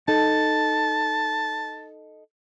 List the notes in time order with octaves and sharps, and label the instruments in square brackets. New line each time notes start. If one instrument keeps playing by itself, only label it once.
[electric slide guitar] D#4 A4 [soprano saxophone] A5